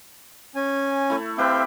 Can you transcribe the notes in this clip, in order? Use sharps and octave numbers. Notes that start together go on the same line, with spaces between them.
C#4 G#5
A3 E4
C4 G4 B4 E5 F5 G5